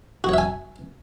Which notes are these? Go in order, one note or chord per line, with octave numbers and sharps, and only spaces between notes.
F#4 C#5 E5 G#5